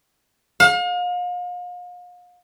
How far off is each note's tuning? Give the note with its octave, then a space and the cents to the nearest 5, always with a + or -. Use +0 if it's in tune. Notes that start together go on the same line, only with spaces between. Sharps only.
F5 +40